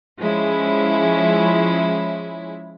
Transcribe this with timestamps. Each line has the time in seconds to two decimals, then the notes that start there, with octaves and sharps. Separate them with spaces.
0.18 F3 G#3 C#4 E4